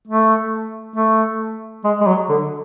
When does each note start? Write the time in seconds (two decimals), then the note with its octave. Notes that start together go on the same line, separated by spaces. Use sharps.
0.08 A3
0.96 A3
1.84 G#3
2.01 G#3
2.07 F#3
2.29 D3